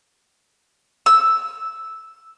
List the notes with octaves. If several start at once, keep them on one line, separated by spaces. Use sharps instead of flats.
E6